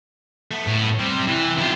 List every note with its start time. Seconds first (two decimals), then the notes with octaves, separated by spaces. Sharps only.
0.51 A3 B3
0.67 A2
1.00 C3 G3
1.27 C3 E3
1.58 B1 E4 F4 G4